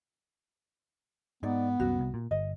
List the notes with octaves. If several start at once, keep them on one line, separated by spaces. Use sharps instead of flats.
G#2 B3 D#4 D5
C2 F#2 F#4
C2
A#2
G1 D#5